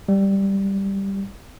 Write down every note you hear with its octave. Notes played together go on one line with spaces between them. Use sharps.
G3